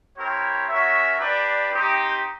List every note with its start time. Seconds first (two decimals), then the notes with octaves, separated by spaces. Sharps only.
0.18 C4 E4 G4 A#4 C#5
0.69 C#4 F#4 A#4 C#5 E5
1.20 D4 G4 B4 D5
1.71 C4 D#4 G4